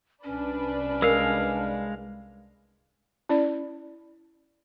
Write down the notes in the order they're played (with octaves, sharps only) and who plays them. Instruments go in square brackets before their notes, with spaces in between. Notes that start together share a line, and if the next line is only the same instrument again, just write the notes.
[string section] C2 D4 B4 [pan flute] C#4
[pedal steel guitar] G#3 F5 [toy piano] A#4
[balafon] C#4 E4 D5